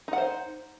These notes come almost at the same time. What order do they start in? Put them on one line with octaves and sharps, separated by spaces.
D#4 F#5 C5